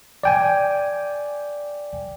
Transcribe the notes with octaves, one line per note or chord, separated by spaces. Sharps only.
D5 G5 G#5